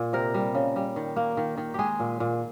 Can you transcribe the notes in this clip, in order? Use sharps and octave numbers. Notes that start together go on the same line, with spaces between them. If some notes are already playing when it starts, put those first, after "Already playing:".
Already playing: A#2
C3 A#4
G3
C#3
G3
D#3
A#3
D#3
D#3
G#3 G4 G#4
A#2
A#2